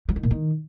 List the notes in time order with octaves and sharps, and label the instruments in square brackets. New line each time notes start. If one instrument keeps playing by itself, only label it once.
[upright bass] F#3
D#3
A#2
D#3